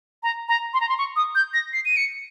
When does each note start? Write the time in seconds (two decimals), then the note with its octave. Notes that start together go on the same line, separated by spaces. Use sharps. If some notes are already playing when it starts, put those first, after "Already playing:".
0.23 A#5
0.48 A#5
0.74 C6
0.81 A#5
0.89 C6
0.98 C#6
1.16 D#6
1.35 G6
1.54 A#6
1.73 C7
1.85 D#7
1.97 C#7